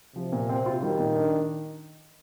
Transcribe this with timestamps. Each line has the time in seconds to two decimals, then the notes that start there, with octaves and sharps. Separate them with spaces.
0.16 C3 F3
0.33 A#2
0.49 C4
0.66 F4
0.83 D#3 G3
0.99 A#2
1.16 D4